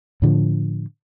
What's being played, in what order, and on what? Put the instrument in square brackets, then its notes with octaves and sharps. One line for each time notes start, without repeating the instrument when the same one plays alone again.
[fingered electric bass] A2 D3 F3